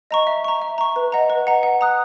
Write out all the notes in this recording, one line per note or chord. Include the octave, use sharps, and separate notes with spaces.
D#5 A#5 C#6
E5
A#5 C#6
E5
A#5 C#6
B4
D#5 F#5 A#5
B4
D#5 F#5 A#5
F#5
A#5 D#6 F#6